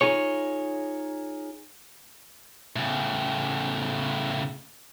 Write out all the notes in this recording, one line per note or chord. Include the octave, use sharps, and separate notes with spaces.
D#4 F4 G#4 C#5
A2 C#3